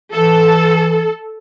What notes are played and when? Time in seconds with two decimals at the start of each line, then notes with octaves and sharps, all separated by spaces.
0.13 E3 A4